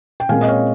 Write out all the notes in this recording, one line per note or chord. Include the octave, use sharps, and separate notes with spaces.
G5
A#2 G#3 C4 F5 G#5
D#5
C#5 F5